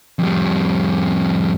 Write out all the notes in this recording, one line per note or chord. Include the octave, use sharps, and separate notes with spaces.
F2 G3